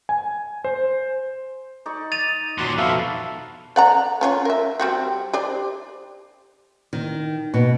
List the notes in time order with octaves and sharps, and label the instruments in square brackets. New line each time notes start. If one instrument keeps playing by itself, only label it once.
[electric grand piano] G#5
C5
[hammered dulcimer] D#4 D5 C#6
[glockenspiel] A6 D#7 F7
[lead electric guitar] D#2 A#2 [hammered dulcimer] F#3 [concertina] C6 D6 F#6
[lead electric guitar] F2 B2 [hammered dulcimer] F#4 B4 [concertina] A4 E5 F5
[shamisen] D5 F#5 A#5
C#4 F4 C#5
A#4 E5
G3 C4 F#4
G4 C5 D5
[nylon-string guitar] D#3
B2